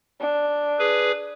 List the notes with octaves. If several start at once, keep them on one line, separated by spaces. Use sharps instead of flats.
D4
G#4 B4